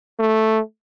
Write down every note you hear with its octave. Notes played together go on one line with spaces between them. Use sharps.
A3